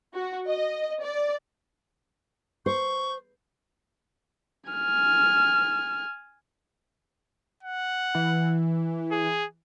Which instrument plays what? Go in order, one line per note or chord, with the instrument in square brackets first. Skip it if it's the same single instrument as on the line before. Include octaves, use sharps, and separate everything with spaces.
[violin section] F#4
D#5
D5
[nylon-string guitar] C5 [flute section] C#6 G6
[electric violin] G#5 F6
[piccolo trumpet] F#5
[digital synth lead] E3
[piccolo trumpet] G#4